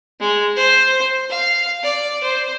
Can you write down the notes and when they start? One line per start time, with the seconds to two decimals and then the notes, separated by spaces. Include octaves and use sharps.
0.20 G#3
0.56 C5
1.30 F5
1.83 D5
2.24 C5